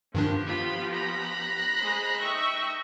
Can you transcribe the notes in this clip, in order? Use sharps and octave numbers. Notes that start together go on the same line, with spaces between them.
G2 D#3 F3 B3 D4 G4
F4 B5
A#5 B5 F#6 A#6
G#3 C5
D#4 E5 G5 C#6